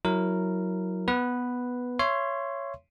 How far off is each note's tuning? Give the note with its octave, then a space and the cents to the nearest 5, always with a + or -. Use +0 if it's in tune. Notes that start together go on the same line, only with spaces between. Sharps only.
F#3 +0 E4 -15 A#4 -10
B3 +0 B4 +0
C#5 +0 E5 +35 C6 +0